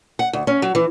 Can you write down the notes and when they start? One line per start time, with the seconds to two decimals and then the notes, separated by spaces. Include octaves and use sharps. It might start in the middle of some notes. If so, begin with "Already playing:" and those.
0.19 F#5
0.33 D2
0.47 C#4
0.62 F#3
0.75 E3